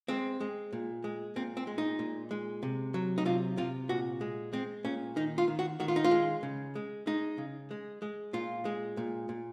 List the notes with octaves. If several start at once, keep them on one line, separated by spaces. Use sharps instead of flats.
G#3 C4
G#3
A#2
G#3
A#2 C4
C4
G#3
D#4
A#2
G#3
C3
F#3
D#4
C3 F4
C3 F4
A#2 F#4
G#3
G#3 C4
A#2 C#4
D#3 D#4
F4
D#3
F#4
D#3 F#4
F4
D#4
F4
G#3
C#3
G#3
G#3 D#4
C#3
G#3
G#3
A#2 F4
G#3
A#2
A#2